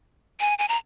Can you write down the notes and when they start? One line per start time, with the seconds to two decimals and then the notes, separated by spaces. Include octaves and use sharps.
0.40 G#5
0.59 G#5
0.68 A#5